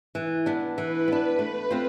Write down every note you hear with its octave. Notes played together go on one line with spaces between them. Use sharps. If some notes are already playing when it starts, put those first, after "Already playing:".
E3
B3 D4
E3 B4
B3 D4
A3
C4 F4 C5